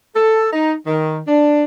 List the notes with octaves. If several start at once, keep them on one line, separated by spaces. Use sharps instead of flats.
A4
D#4
D#3
D4